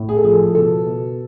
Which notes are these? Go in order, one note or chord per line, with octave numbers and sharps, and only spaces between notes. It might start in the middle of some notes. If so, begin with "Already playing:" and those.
Already playing: A2
G#4
A4
F3 G#4
A4
B2 A4
B2